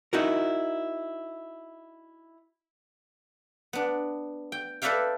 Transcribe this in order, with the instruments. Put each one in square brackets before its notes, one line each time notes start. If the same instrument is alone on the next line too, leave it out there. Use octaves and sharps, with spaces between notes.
[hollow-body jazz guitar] D#4 E4 F#4 A#4
[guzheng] B3 D4
G5
A4 B4 D5 E5 F5 G5